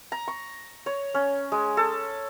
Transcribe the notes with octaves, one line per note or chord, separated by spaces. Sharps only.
A#5
C#6
C#5
C#4
G#3
A4